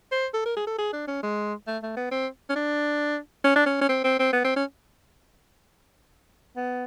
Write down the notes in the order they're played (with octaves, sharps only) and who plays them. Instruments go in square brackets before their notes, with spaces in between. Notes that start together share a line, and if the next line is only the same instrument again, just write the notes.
[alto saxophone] C5
A4
A#4
G#4
A4
G#4
D4
C#4
G#3
A3
A3
B3
C4
C#4
D4
C#4
D4
C#4
C#4
C4
C4
C4
B3
C4
C#4
B3